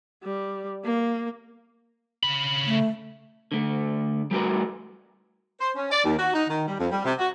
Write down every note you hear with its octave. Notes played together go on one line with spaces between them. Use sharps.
G3
A#3
C#3 B5
A3
D3 A3
G3 A3 F#4 A#4 B4
C5
C#4
D5
D#2
F#4
D#4
D#3
G3
F2
G3
C3
F#4